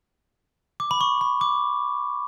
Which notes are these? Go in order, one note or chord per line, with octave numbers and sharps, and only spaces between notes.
D6
B5
C#6
B5
D6